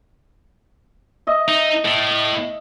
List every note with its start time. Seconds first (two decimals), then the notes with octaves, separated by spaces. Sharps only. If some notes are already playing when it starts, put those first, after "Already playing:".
1.27 D#5 E5
1.48 D#4
1.85 A2